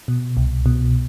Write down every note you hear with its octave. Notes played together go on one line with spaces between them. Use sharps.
B2
C2
B2